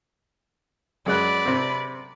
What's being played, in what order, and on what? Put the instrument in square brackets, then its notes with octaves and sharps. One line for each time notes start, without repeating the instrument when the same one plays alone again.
[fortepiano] F#2 G#3 F#6 [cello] B4 D5
[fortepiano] C3 C4